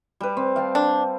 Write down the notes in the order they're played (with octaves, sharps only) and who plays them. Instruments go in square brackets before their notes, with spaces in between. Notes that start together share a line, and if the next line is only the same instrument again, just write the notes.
[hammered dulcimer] G3 B4
C4
F5 G5 A5
[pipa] D4